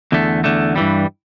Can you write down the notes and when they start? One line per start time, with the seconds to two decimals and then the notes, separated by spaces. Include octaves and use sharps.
0.12 E2 D3 A3
0.44 E2 D3 A3
0.76 G2 E3 G3